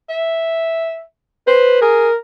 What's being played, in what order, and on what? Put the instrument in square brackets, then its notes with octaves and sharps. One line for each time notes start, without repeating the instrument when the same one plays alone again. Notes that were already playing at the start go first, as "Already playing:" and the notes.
[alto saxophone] E5
[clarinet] B4 [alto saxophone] C5
[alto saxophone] G#4 [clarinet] A#4